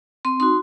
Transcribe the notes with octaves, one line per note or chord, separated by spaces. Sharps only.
C4 C6
D#4 F#4 C6